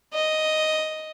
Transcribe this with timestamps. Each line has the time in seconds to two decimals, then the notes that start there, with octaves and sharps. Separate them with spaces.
0.14 D#5